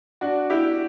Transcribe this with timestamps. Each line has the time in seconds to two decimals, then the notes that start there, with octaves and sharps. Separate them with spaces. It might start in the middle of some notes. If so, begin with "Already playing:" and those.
0.21 D4 F#4
0.50 E4 G4